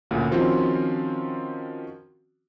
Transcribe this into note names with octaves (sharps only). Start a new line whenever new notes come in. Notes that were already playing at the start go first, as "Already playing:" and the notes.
D2 A#2 C#3
D#3 F3 C4 C#4 F4 F#4